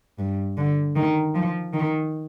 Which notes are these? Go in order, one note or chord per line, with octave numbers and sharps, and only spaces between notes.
G2
D3
D#3
F3
D#3